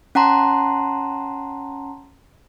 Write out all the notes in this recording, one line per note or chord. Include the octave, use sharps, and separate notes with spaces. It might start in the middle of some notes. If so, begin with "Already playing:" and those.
C#4 F#5 A5 A#5 C6